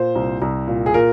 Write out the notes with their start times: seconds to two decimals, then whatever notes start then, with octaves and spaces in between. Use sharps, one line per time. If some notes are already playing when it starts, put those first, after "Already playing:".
Already playing: A#2 C5
0.15 C2
0.42 C2
0.68 A#2
0.86 G#4
0.94 A#2 A#4